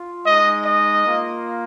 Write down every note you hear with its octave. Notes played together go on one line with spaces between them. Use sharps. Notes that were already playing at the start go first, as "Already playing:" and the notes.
Already playing: F4
G#3 D#4 D#5
D#5
A#3 F4